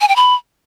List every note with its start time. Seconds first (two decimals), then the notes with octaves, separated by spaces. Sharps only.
0.01 G#5
0.08 G5
0.16 B5